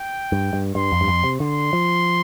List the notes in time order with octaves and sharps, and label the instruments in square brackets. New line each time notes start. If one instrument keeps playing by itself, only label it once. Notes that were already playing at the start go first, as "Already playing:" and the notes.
Already playing: [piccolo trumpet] G5
[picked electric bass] G2
G2
[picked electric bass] G2 [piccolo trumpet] C6
[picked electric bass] F2
G2
F2
C3
[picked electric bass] D3 [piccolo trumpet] C6
[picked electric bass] F3